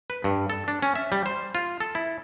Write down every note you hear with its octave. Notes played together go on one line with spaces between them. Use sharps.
B4
G2
A4
D4
C#4
E5
G3
C5
F4
A4
E4